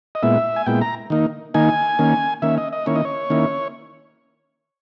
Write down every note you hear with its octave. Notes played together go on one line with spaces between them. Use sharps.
D#5
A#2 G#3 B3 E4 E5
G#5
A#2 G#3 B3 E4 G5
A#5
D#3 A#3 D#4
D#3 A#3 D#4 G#5
D#3 A#3 C#4
D#3 A#3 C#4 E5
D#5
D#5
D#3 A#3 C#4 E4 C#5
D#5
C#5
D#3 A#3 C#4 E4